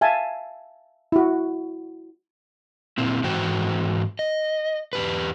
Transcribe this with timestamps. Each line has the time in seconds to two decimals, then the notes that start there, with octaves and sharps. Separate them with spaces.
0.01 E5 F5 G#5 A5
1.12 E4 F#4
2.98 A#2 C4 E4
3.23 G#2 E3 F#4 C5 G5
4.19 D#5
4.93 E2 G4 B4